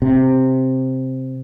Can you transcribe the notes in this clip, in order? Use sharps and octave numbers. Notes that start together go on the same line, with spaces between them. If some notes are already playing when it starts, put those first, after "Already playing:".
C3